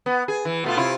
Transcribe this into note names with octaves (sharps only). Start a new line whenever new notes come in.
B3
G#4
E3
B2 A3 F4
C3 E4 F4